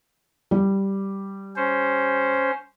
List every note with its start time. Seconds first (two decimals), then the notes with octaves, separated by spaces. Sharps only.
0.51 G3
1.56 C#4 C5